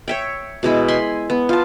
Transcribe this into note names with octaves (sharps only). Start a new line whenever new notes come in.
C#5 E5 G5
B2 G#3 E4
G#5 B5 C6
B3
F4 A5